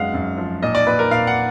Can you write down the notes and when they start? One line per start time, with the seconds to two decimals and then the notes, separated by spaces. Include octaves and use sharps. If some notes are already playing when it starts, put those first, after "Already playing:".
Already playing: F#2 G#3 B3 F5 F#5
0.14 F#2
0.38 F3
0.63 A#2 D#5
0.75 D5
0.86 A#2 B4
0.99 A#4
1.11 A#2 F5
1.27 F#5